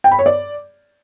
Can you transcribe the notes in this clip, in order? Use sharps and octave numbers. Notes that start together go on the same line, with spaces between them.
G5
B5
C#5
D5